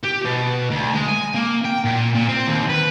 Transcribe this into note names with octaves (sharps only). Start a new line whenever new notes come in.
G4
B2
D2
G#3
G#5
A#3
G5
A#2
A#2
C4
D#2
B4